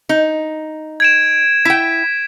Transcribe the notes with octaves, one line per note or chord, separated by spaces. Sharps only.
D#4
G#6 D7 E7
E4 G5 B6